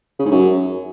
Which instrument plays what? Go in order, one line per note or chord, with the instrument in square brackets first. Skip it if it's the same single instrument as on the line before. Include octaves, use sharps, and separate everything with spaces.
[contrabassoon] C#3
G#2
F#2